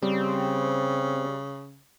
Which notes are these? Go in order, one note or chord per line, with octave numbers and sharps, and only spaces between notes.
C#3 G3 C4